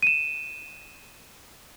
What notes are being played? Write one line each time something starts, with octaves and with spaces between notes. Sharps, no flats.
D#7 E7